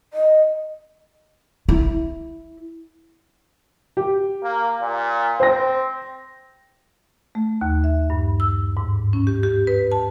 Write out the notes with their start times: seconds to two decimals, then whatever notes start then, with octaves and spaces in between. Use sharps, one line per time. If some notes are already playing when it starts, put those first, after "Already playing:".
0.14 D#5
1.69 E4
3.97 G4
4.43 A#3
4.82 A#2
5.40 C4 C5 A#6
7.35 A3
7.61 D#2
7.84 E5
8.10 G2
8.40 E6
8.77 G#2
9.13 C#4
9.27 G4
9.43 G4
9.67 B4
9.92 A5